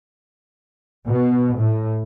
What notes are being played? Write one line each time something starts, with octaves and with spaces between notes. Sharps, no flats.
B2
A2